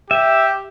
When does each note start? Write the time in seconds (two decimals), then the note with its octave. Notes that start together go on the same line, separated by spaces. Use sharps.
0.10 G4 E5